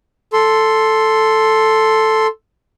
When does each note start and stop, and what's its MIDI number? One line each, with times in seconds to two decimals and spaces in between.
0.33 2.27 69
0.33 2.27 84